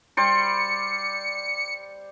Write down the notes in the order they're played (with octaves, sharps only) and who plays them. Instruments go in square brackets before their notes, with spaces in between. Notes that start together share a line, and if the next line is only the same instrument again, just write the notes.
[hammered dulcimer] G3 C5 D5 [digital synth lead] C#7